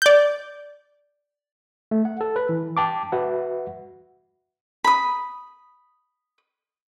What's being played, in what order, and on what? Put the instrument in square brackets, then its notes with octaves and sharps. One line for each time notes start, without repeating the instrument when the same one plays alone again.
[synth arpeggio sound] D5 G6
[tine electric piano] A3
F#5
A4
B4
E3
[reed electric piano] G5 A5 D6
F#4 B4 E5 F#5
[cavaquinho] B5 D#6